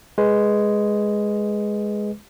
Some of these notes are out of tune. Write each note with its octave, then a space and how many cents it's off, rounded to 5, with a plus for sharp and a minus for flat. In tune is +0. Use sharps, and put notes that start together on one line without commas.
G#3 +0 B4 +0